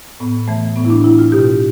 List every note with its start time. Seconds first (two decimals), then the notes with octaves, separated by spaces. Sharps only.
0.20 A2 B3
0.48 E3 A3
0.76 A2 B3
0.85 E4
0.90 D4
1.04 E3 E4
1.19 F4
1.32 B2 G4